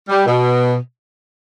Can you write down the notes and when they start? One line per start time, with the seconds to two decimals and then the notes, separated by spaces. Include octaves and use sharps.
0.09 G3
0.26 B2